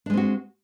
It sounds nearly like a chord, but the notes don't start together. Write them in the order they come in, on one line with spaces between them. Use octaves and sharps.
D4 G#3 C4 F#4